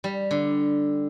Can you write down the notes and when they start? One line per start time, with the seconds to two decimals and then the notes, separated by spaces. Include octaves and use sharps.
0.04 G3
0.31 D3